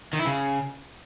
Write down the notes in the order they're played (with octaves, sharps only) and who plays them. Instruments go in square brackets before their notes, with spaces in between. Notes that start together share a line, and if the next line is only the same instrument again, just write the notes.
[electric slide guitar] D#3
E4
C#3